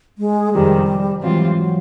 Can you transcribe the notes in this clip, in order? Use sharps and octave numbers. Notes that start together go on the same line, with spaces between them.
G#3
F2 C3 D#3 G3
G#2 E3 F#3 G3 C4 F4
F#3